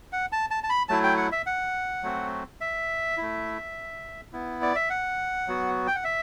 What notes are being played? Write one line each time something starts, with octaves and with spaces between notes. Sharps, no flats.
F#5
A5
A5
A5
B5
F#3 A3 E4 A5
G5
F#5
E5
F#5
F#3 A3 C4 F#4
E5
A3 E4
B3 E4
D5
E5
F#5
F#3 B3 F#4
G5
F#5
E5